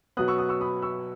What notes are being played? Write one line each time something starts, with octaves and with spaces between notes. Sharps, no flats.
B2 F#3 B3 D#6 F#6
C#6 E6
D#6 F#6
C#6 E6
B5 D#6
C#6 E6